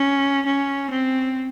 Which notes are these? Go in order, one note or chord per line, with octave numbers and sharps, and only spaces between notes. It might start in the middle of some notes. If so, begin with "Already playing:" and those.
Already playing: C#4
C#4
C4